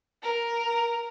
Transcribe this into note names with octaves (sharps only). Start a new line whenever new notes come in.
A#4